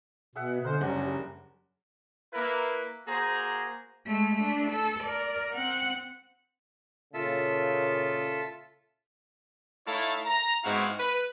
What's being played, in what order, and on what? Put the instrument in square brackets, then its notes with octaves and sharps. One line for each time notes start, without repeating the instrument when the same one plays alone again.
[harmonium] B2 [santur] G#4 E5 F#5
[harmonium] D3 C5 [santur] A#4 D#5 G#5
[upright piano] F#1 [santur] F#3 D4 F#5 [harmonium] G3
[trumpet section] A#3 E4 A#4 B4
A#3 F#4 G#4 C5 A#5
[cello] G#3 A3
A3 D4
A4
A#4 D5
C4 F#5
[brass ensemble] A#2 C#3 [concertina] F4 A4 E5
[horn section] A3 D#4 E4 C#5 F5 A5
A#5
G#2 B3 C4 E4 F#4 F5
B4